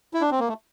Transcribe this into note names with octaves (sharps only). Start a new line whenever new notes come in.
E4
D4
C4
A#3
A3